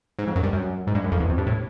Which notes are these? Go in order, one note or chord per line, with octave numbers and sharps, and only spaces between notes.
G#2
F2
F#2
G2
F#2
G#2
G2
F#2
F2
E2
F2
G2
A2